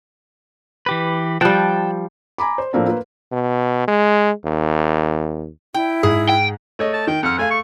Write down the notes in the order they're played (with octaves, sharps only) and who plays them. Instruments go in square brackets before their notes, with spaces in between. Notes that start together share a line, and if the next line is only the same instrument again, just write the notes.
[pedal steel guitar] E3 G4 B4
[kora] F3 G3 [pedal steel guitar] G5 A5 F#6
[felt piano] G#5 A#5 B5 D6
C5
A2 F3 A3 A#3 C4 D4
A#3 F4 B4
[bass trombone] B2
G#3
D#2
[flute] E4 [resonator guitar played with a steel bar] G5
[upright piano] G#2 [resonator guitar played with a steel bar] G#4
[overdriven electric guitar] G5
[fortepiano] A3 C#5 D#5
[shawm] A5
[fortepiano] D#3 [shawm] G5
[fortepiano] F2 F6 [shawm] F#5
[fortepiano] A3 F5 [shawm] G#5
[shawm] C#6